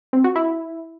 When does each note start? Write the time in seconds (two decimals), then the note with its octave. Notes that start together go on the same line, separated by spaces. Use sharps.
0.13 C4
0.24 F#4
0.36 E4